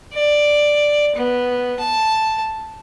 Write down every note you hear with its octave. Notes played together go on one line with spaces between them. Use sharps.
D5
B3
A5